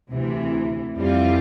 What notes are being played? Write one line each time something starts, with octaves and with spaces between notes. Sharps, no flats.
D2 C3 E3
F2 E3 G3 C4 F4